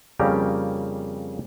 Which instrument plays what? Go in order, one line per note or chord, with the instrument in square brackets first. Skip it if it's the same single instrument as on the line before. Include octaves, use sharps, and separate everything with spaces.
[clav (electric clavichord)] F2 C#3 G3 A#3 G4 A#5